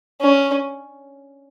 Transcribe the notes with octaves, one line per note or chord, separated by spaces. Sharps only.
C#4